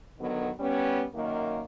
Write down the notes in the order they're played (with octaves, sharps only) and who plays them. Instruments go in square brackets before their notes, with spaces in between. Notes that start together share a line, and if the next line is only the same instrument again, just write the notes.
[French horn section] D3 D#3 F#3 B3
G3 B3 C#4
F#2 D#3 A#3